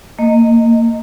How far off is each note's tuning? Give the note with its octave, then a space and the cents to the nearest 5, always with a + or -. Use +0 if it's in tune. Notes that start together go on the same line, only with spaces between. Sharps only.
A#3 -20 D#5 +0